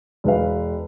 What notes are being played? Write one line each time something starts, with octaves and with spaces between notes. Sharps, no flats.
E1 B4 F5